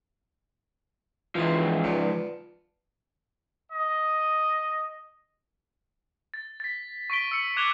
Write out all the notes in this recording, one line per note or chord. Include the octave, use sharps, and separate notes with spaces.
C#2 E3 F3 D#5
B3 D4 F4
D#5
A6
A6 B6
C#6 B6 D7 G7
E6 C#7
D6 F#6 G#6 E7 F7 G7